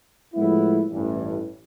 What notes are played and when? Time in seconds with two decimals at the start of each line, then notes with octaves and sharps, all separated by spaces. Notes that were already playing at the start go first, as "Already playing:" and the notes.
0.34 A2 F3 G#3 B3 E4
0.92 A1 G2 E3